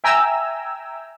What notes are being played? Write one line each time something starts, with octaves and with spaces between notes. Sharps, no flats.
E5 G5 G#5 A#5 E6